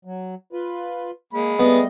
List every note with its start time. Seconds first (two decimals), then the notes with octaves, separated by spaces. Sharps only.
0.05 F#3
0.53 F4 B4
1.33 G#3 A#3 B5
1.59 G3 A3 B3 D#5